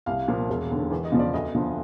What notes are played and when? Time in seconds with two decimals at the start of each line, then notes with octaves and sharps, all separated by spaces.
0.06 C2 F5
0.28 A#2 F3
0.49 E1
0.71 D#2 D3
0.90 E2
1.05 D#5
1.12 C#3 F3
1.19 D5
1.33 D2 D#5
1.55 D3 F3